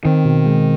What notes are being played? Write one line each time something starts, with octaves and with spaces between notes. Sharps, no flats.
D#3 C4
B2
G#3